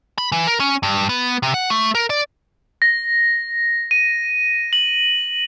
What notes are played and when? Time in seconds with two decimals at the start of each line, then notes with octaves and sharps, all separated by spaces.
0.18 B5
0.32 E3
0.47 A#4
0.60 C#4
0.83 G2
1.09 B3
1.43 C3
1.54 F#5
1.70 A3
1.95 A#4
2.10 D5
2.82 A#6
3.91 D#7
4.73 F#7